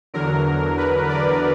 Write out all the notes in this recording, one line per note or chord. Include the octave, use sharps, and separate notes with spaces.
E2 D3 F#3 A#4
B4
D5